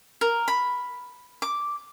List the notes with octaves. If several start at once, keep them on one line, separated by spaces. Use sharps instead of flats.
A#4
B5
D6